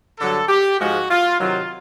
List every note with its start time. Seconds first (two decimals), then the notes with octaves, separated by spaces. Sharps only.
0.18 G2 D3 F#3 A4
0.48 G4
0.79 G#2 F3 G#3 F#4
1.09 F4
1.39 C3 D#3 F#3 F4